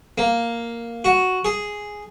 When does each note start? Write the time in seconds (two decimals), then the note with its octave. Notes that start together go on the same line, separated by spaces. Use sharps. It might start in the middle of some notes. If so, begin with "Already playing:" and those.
0.18 A#3
1.05 F#4
1.45 G#4